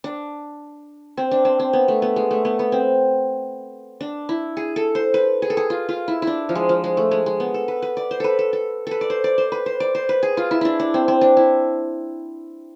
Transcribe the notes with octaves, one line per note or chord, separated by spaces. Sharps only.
D4
C4
D4
C4
C4
B3
A3
B3
G#3
A3
B3
B3
C4
D4
E4
G#4
A4
C5
B4
G#4
A4
G#4
F4
F4
E4
E4
D4
F3
G#3
F3
G#3
A3
G#3
G#3
B3
A4
B4
B4
D5
C5
A4 B4
A4
A4
A4 B4
D5
C5
D5
C5
B4
C5
D5
C5
B4
G#4
F4
E4
D4 E4
D4
C4
C4
D4
E4